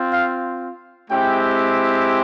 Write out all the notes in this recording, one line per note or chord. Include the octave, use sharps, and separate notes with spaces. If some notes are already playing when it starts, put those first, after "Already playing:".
Already playing: C4 F4
F5
G#3 C4 E4 G4 G5